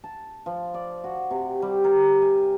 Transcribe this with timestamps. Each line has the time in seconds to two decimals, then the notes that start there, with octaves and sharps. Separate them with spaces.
0.04 A5
0.46 F3
0.74 D5
1.04 F#4
1.31 C3
1.62 G3
1.84 A#4
2.22 G#5